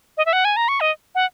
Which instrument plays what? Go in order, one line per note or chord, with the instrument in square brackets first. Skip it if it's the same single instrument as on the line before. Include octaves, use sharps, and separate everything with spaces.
[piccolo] D#5
E5
F#5
G#5
A#5
C#6
D#5
F#5